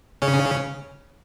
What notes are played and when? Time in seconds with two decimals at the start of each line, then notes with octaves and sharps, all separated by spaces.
0.22 C#3 C#4